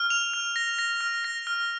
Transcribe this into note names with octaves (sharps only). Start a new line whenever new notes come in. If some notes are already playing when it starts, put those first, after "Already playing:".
Already playing: F6
F7
F6
A#6
A#6
F6
A#6
F6